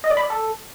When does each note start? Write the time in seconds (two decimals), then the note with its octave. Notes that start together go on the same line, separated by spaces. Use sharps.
0.04 D#5
0.10 D5
0.17 B5
0.23 D5
0.30 A4